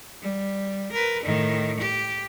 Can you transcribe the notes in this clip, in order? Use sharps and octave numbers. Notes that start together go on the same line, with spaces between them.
G3
A#4 B4
A2 D#3
G4